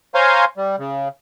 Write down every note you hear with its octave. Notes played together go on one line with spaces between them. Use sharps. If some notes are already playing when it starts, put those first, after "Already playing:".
C5 C#5 F5 G#5 A#5 C6
G3
C#3